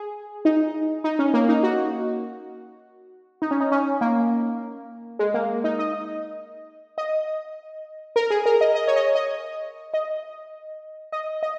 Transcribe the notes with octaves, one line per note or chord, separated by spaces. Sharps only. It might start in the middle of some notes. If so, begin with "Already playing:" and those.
Already playing: G#4
D#4
D#4
C#4
A#3
D#4
F#4
D#4
C#4
D#4
C#4
A#3
G#3
A#3
D#4
D#5
D#5
A#4
G#4
A#4
D#5
D#5
C#5
D#5
D#5
D#5
D#5
D#5